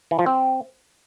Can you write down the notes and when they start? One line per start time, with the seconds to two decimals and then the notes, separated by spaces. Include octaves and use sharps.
0.11 E3
0.19 F3
0.26 C4